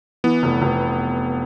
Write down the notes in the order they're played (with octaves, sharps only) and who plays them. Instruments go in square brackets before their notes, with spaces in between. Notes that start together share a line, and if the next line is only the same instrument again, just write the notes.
[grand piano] E3 [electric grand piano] B3
[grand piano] F1
F1